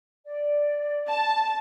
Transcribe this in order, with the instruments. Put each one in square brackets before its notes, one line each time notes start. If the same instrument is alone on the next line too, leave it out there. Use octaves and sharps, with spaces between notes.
[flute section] D5
[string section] A5